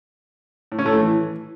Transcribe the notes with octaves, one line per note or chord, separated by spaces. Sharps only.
A2
C#4
A3
A2
E3